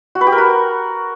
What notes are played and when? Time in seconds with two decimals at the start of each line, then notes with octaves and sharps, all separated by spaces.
0.15 F#4
0.21 B4
0.27 G4
0.32 A#4
0.38 F#4